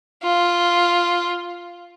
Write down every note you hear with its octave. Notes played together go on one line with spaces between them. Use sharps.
F4